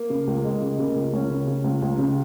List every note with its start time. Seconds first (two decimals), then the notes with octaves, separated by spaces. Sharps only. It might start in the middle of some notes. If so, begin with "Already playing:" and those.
Already playing: A#3
0.10 C#3
0.27 C#2
0.45 C#2 G#3
0.61 C#3
0.79 C#3 A#3
0.96 C#2
1.13 C#2 C#4
1.30 C#3
1.48 C#3
1.64 C#2
1.82 C#2
1.98 C#3